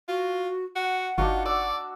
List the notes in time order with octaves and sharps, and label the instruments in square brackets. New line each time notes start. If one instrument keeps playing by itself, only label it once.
[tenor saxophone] F4 [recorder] F#4
[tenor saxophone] F#4 [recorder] F#5
[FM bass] G1 [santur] D4 D#4 F#4 [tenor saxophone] F4
[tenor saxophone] D5 [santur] E6